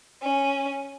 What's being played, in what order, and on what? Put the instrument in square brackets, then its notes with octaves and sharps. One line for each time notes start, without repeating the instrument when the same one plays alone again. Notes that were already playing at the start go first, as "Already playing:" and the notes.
[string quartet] C#4